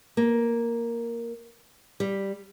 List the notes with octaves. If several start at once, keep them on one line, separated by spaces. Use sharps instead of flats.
A#3
G3